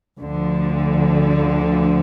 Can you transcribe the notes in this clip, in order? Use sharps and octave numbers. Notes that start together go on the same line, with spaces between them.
D2 D3 F3